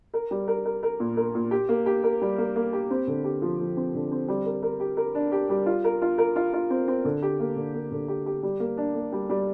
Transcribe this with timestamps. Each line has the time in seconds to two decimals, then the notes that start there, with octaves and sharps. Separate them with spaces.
0.14 A#4
0.31 G3
0.48 A#4
0.65 A#4
0.83 A#4
1.00 A#2
1.17 A#4
1.35 A#2
1.51 G4
1.69 A#3
1.86 G4
2.03 A#4
2.21 G3
2.38 A#3
2.56 A#3
2.73 G4
2.90 C4
3.07 D3
3.24 G4
3.42 F3
3.59 F3
3.77 C4
3.94 D3
4.12 C4
4.28 G3
4.46 A#4
4.63 A#4
4.80 G4
4.97 A#4
5.15 D4
5.32 G4
5.49 G3
5.66 F4
5.84 A#4
6.02 F4
6.18 A#4
6.36 F4
6.53 F4
6.70 C4
6.88 C4
7.05 D3
7.22 G4
7.40 A#3
7.56 D3
7.75 A#3
7.91 D3
8.08 G4
8.26 G4
8.43 G3
8.60 A#3
8.77 D4
8.95 A#3
9.12 G3
9.30 G3